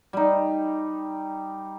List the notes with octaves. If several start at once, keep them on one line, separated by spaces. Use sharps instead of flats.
G3 D#4